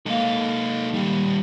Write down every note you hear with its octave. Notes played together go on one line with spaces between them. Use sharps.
G#3 A#3 D#4 A4 F5
D#3 G3